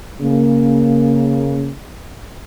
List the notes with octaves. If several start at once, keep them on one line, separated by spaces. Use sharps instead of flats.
C#3 A#3